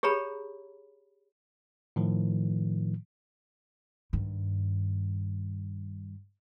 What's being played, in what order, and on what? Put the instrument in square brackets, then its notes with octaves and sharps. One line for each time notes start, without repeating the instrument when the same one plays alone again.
[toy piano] G4 G#4 C#5 A#5 B5
[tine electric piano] A2 D#3 F3
[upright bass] G2 D#3